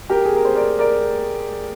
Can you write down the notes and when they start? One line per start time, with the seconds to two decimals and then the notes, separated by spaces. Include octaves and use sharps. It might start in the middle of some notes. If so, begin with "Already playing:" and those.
0.09 G4 A#4
0.25 G#4
0.35 A#4
0.45 C5
0.55 A#4 D5
0.78 A#4 D5